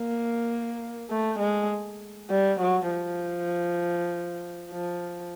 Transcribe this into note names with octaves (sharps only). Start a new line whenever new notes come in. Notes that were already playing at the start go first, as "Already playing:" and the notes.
Already playing: A#3
A3
G#3
G3
F#3
F3
F3